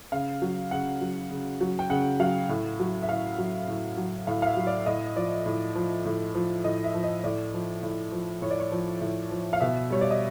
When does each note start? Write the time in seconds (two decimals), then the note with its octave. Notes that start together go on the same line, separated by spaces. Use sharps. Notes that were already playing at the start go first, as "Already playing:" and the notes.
0.12 C#3 F5
0.42 F#3
0.71 C#3 F#5
1.01 F#3
1.31 C#3
1.61 F#3
1.79 G5
1.90 C#3 F#5
2.20 F#3 F5
2.49 A2
2.80 F#3
3.03 E5
3.08 A2 F5
3.38 F#3
3.68 A2
3.97 F#3
4.27 A2 F5
4.42 F5
4.47 E5
4.57 F#3
4.67 D5
4.86 A2 D#5
5.16 F3 D5
5.46 A2
5.75 F3
6.05 A2
6.35 F3
6.64 A2 D#5
6.84 E5
6.94 F3
7.04 D#5
7.24 A2 D5
7.54 F3
7.83 A2
8.12 F3
8.42 A2 C#5
8.51 D5
8.60 C#5
8.72 F3
9.01 A2
9.31 F3
9.53 F5
9.61 B2 E5
9.90 G3 C#5
10.01 D5
10.11 D#5